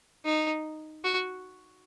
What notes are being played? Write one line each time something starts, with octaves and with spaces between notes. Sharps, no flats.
D#4
F#4